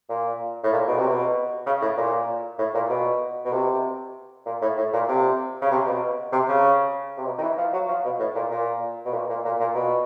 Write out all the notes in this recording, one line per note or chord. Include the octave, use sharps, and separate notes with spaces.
A#2
A2
A#2
B2
C3
B2
C#3
A2
A#2
A2
A#2
B2
B2
C3
A#2
A2
A2
A#2
C3
C#3
C3
B2
C3
C#3
C3
B2
D#3
E3
F3
F#3
F3
B2
A2
A#2
A#2
B2
A#2
A#2
A#2
A#2
B2